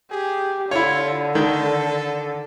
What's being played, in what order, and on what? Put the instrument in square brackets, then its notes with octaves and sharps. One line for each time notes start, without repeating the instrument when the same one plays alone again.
[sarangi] G4 [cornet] G#4
[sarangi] D3 [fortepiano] E4 C#5 [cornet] F4
[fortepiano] D#3 [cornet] A4